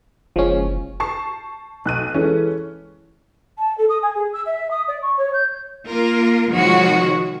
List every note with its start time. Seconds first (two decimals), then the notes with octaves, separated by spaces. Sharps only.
0.36 F#1 F3 G#3 C#4
1.00 A5 C#6 C7
1.85 B1 F#6 D#7
2.14 E3 G#3 C#4 A4
3.58 A5
3.77 A4
3.89 D#6
4.02 G#5
4.15 G#4
4.33 E6
4.46 E5
4.70 D#6
4.88 D5
5.02 C#6
5.17 C#5
5.33 G6
5.88 A#3 F4 A#4
6.50 C3 D#3 F3 G#3 F#4 C#5